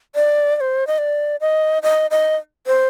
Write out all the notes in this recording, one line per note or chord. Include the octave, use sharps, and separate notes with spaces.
D5
D5
C5
D#5
D5
D#5
D#5
D#5
C5